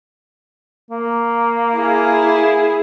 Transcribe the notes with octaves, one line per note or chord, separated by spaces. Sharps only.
A#3
E4 G#4